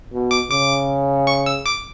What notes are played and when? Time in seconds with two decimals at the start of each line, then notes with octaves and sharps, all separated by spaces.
0.12 B2
0.31 D6
0.50 C#3 D6
1.27 C#6
1.46 E6
1.66 D6